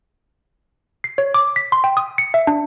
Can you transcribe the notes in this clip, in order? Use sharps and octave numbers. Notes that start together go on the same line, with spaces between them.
C7
C#5
D6
B6
C6
G5
D#6
C#7
E5
D4